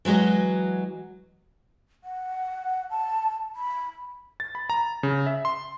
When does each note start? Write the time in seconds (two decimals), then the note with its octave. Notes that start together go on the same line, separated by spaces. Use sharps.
0.05 E3 F#3 G#3 F#4 D#5
2.04 F#5
2.90 A5
3.55 B5
4.40 A6
4.55 B5
4.70 A#5
5.03 C#3
5.26 E5
5.45 C6